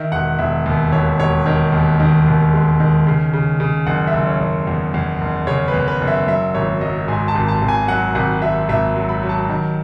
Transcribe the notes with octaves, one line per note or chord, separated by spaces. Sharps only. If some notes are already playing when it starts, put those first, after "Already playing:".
Already playing: D#3 E5
E1 F#5
E1 E5
D#2
E1 C#5
E1 C#5
D#3 C#5
D#2
D#3
D#2
G#3
D#3
C#3
C#3
C#3
F#1 F#5
E5
F#1
C#5
F#1
E2
E2
F#1
C#3 C#5
B4
E2
B4
F#1
E5
F#3 E5
G#1 C#5
F#3 D#5
G#2 G#5
A5
G#1
A5
G#1
G#5
F#3 F#5
G#1 F#5
G#1 E5
G#1 E5
F#3
B5
F#3
A5
D#3